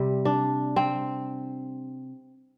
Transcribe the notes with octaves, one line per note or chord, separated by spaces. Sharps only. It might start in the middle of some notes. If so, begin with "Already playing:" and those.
Already playing: C3 G3
D4
C4